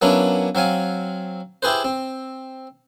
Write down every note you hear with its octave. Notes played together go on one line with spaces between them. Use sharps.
F#3 A#3 B3 C#4 D4 E4
F#3 C4 F5 G#5
E4 G4 G#4 B4 C5
C4